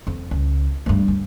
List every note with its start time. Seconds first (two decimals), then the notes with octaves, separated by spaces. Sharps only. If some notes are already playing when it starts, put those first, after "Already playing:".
0.07 F2
0.31 C#2
0.86 G2 A3
1.08 D2